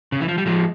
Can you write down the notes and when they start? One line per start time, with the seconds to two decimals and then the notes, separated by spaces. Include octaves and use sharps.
0.12 C#3
0.20 E3
0.28 F3
0.38 G3
0.46 F3 G#3